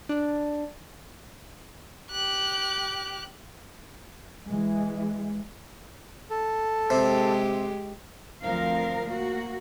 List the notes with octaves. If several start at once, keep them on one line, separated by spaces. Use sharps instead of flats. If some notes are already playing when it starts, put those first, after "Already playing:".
D4
G4 F#6
E3 G#3
A4
C3 G#3 G4
D2 F3 C4 A#4 F5
A#3 F#4